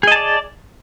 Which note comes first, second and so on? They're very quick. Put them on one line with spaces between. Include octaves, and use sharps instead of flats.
G#4 D#5 A5 D5